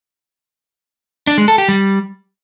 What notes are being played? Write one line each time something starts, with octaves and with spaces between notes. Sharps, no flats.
D4
G#3
A4
G4
G3